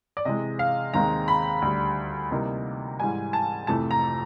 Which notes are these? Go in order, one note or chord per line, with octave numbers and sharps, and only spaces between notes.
D5
C3 E3 G#3 D#5
F5
D#2 D#3 G#3 C4 D#4 A#5
B5
D2 D3 G3
C3 E3 G3 A#3 D#4
G#2 E3 G3 G#5
A5
F2 C3 E3 A3 A5
A#5